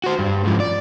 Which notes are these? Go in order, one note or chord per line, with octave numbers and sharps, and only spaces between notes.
F#4 C5
G2
G#2 F3
D5